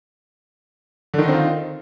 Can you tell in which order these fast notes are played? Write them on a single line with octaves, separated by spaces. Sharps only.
D3 D#3 D#4 C4 F4